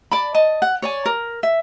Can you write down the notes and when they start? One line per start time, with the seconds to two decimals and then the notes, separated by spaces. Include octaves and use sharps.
0.12 D5 A5 B5
0.34 D#5 A5
0.62 F#5
0.82 C#5 D5 G#5
1.06 A#4
1.43 E5